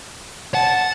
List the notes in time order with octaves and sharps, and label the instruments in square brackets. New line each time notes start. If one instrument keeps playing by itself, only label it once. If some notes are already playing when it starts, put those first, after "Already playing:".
[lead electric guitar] F#5 [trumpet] A5